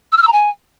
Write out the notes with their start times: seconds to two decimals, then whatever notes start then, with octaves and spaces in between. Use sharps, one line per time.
0.12 E6
0.17 F6
0.22 E6
0.27 A#5
0.32 G#5